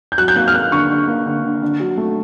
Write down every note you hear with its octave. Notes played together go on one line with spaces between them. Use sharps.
G6
F#3 F#6
G6
A#3 F#6
F6
A#3 F#6
D3 C#6
D3
A#3
D3
D3
D3
F#3
A3